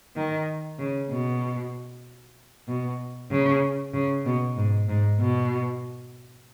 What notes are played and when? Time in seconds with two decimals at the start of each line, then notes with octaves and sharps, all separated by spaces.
0.16 D#3
0.79 C#3
1.10 B2
2.68 B2
3.31 C#3
3.94 C#3
4.26 B2
4.57 G#2
4.89 G#2
5.20 B2